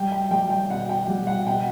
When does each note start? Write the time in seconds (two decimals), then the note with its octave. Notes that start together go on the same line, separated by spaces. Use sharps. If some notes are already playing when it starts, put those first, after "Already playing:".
Already playing: G3 G5
0.12 G5
0.31 G3 G5
0.50 G5
0.70 B2 F#5
0.89 G5
1.08 G3
1.27 F#5
1.46 B2 G5